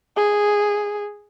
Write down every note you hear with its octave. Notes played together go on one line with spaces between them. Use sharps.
G#4